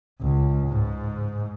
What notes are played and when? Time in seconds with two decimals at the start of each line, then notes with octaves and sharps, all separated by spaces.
0.21 C#2
0.69 G#2